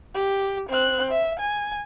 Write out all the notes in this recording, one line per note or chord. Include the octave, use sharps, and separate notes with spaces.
G4
C4 F#6
E5
G#5